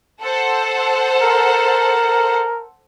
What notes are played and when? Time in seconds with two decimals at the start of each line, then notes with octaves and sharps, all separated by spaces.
0.22 A4 C5 F#5
1.22 A#4